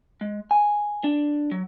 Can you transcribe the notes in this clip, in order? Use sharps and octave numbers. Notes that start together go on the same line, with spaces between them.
G#3
G#5
D4
F#3